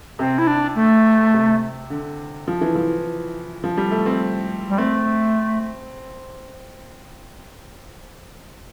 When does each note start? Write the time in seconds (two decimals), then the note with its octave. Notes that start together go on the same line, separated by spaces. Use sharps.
0.19 C3 C4
0.38 E4
0.47 D4
0.75 A3
1.34 C3
1.90 D3
2.48 F3
2.61 E3
2.76 F3
3.64 F3
3.77 G3
3.91 A3
4.06 C4
4.69 G3
4.78 A3 C4